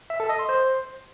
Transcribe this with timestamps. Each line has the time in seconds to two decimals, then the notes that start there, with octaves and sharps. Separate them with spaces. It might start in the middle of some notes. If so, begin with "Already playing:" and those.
0.10 E5
0.20 A4
0.29 D#5
0.39 C6
0.49 C5